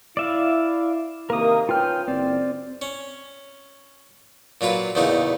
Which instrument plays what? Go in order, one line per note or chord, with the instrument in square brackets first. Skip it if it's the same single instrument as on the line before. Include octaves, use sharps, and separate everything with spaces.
[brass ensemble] E4 [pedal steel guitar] D5 E5 F5
[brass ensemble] C3 D#3 A#3 [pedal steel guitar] A#4 D#6
[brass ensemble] C#4 G5 [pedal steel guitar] F4 B4 F6
[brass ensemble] F#1 [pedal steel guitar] C4 D5
[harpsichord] C#4
A#2 F#3 F4 B4
E2 A#2 C#3 A3 D#4